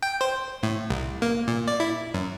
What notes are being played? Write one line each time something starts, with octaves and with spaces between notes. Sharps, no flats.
G5
C5
A2
C2
A#3
A#2
D5
E4
F#2